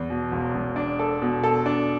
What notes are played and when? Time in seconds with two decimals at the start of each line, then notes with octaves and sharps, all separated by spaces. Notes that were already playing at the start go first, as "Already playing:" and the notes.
Already playing: E2
0.10 B2
0.32 E1
0.54 E1
0.76 D4
0.99 A4
1.22 B2
1.43 A4
1.66 D4